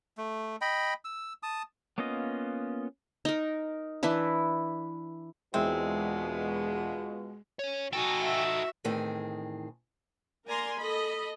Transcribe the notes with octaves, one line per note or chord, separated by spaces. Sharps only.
A3
D#5 G5 B5
E6
A5 D#6
A#3 B3 C#4 F4 D#5
D#4 A#4
E3 D4 E4 B4
E1 B2 G#3 C4 E4 F4 E5
C#4 C#5
D#4 F#4 A4 G5 G#5
E5
E2 A2 D#3 C4 G#4
A#3 A#4 D5 G#5 A#5 C6
A4 D#5 B5